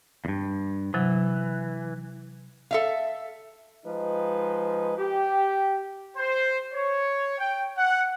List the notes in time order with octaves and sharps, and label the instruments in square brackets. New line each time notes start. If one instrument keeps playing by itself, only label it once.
[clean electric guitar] E2 G2
[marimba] C3 F#3 [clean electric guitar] E3
[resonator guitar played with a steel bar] A4 E5 F5
[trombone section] F3 G#3 D#4 B4
G4
[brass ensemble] C5
C#5
G5
F#5